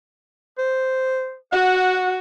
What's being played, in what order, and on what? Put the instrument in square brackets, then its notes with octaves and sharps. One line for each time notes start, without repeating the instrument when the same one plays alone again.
[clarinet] C5
[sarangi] F#4 [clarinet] F#5